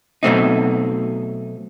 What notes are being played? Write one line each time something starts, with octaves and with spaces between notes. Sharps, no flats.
B2 F#3 A3 C4 D#4